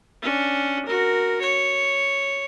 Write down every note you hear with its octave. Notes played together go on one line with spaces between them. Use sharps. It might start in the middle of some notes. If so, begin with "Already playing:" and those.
C#4 D4
F#4 A#4
C#5